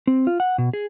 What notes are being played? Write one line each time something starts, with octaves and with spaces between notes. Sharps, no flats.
C4
F4
F#5
B2
G#4